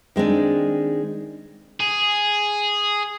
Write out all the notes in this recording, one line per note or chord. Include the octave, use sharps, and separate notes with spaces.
D#3 G#3 C4 D4
G#4